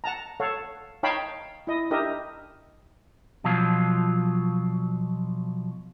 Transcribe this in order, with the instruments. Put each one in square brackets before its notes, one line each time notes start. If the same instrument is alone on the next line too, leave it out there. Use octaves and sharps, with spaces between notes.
[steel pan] F#5 A5 A#5
A4 C#5 F5 F#5
D#4 C#5 F5 G5 A5 B5
E4 D#5
D4 D#4 G4 A#4 D#5 E5
[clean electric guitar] B2 F3 F#3 F4